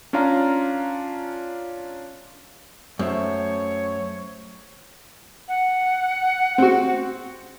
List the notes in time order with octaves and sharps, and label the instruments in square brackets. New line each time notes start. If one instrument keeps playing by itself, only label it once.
[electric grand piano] C#4 D4 F4 F5 A#5
[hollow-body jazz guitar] F#2 [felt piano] A3 C5 E5 [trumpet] C#5
[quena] F#5
[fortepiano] C4 F#4